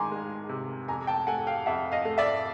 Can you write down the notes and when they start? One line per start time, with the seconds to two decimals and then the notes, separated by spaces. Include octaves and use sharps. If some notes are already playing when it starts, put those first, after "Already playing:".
Already playing: D#3 G#3 G#5 A#5 C6 D6
0.11 G#3
0.49 C3
0.88 F2 G#5 A#5
1.07 G5 A5
1.27 A3 F#5 G#5
1.47 F5 G5
1.66 F2 E5 F#5
1.92 D#5 F5
2.05 A3
2.18 D5 E5